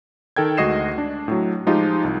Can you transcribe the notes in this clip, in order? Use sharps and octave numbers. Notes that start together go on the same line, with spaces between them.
D#3 A4 G5 G#6
D2 G#3 F#4 D#5 C7 E7
D4
A2 F#3
F3 G#3 D#4 F4 G4
C2